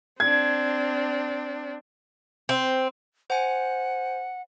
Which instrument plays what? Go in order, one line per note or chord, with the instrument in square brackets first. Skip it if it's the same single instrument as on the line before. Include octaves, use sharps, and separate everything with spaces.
[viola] C4 D4 [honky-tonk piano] G#6
[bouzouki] C4
[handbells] C5 G#5 [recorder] F#5